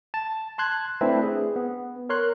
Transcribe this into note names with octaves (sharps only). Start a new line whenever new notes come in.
A5
A5 C6 F#6 G#6
A3 C4 D4 E4 B4
G#4
B3
A#4 C#5 C6 F#6